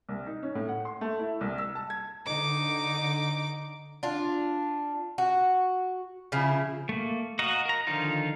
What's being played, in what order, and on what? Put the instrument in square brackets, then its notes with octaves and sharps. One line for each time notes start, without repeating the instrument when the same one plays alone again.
[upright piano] C2
D#4
C#4
A2
F#5
C6
A3
E4
C2
E6
A5
G#6
[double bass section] D3 [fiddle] D#4 D6
[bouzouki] D4 F4
F#4
C#3 F3 E4
[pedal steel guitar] A3 A#3
F#4 D#5 F5 A#5
A#4 A#5
D3 D#3 F3 D#4 F4